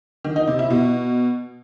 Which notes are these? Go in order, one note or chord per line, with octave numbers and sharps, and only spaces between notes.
D#3
D#4
C3
E4
B2